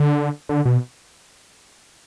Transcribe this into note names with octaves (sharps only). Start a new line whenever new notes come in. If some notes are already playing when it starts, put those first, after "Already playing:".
Already playing: D3
D3
B2